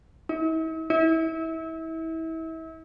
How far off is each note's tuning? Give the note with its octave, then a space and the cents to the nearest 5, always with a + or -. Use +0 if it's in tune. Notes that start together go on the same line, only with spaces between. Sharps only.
E4 -45
E4 -30